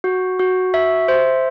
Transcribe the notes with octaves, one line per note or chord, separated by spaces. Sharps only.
F#4
F#4
E5
C5